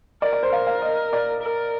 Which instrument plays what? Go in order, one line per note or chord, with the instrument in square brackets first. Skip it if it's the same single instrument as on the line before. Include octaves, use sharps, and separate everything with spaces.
[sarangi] A#4 [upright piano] D5
[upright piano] D5
C5
[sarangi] A#4 [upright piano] F5
[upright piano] F5
D#5
D5
[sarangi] A#4